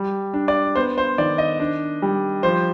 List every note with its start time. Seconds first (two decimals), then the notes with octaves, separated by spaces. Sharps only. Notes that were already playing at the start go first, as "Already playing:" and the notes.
Already playing: G3
0.34 D4
0.48 D5
0.75 B3 C5
0.98 C5
1.18 D#3 D5
1.38 D#5
1.60 D4
2.02 G3
2.43 F3 C5